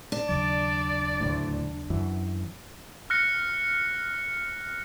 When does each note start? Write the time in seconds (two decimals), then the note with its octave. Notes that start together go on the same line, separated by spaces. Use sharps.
0.12 D4
0.29 D#2 C#3 F#3 D5
1.20 D2 A2
1.90 F#2 E3
3.10 F6 F#6 A#6 C#7